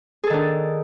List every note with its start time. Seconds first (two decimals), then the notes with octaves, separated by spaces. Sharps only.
0.24 G#4
0.27 A4
0.30 D#3
0.33 D4